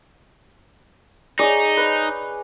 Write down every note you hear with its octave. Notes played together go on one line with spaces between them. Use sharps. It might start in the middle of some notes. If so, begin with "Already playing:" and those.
D#4 G#4 C#5 D5
B4